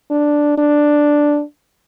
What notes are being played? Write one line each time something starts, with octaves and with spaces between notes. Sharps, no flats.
D4
D4